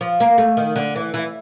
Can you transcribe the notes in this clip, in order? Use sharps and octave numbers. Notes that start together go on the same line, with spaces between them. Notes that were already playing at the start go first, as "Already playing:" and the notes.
F3
A#3
A3
D#3
D3
E3
E3